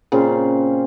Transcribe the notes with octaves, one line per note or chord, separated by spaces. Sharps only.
A#2 C#3 C4 C6